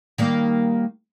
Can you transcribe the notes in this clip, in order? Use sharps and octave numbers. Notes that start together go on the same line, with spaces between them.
D#3 G3 A#3